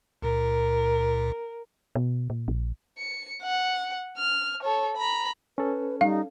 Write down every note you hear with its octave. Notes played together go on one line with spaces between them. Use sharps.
C#2 A#2 A#4
B2
A#2
A#1
C#7
F#5
F6
A4 C#5
A#5 B5
C#4 A4 B4
G3 D#4 F5